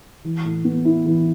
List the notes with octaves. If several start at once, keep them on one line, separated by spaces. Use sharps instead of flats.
E3
A2
B3
E4
E3